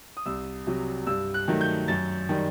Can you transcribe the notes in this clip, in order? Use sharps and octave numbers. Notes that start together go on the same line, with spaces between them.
D#6
C2 E6
C3 F#3
G2 E6
F#6
D#3 F#3 A3
G6
F#2 A6
D#3 G3